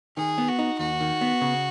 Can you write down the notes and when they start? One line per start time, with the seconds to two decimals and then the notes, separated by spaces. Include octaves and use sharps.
0.17 D#3 G#4
0.38 B3
0.48 F#4
0.59 D#4
0.79 D#2 F#4
1.01 D#3
1.21 B3
1.41 C#3